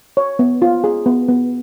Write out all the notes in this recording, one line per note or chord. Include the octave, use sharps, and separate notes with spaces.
C#5
B3
F4
G#4
B3
B3